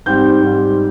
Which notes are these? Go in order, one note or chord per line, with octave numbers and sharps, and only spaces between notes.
G#2 G3 C4 G6
G#2 G3 C4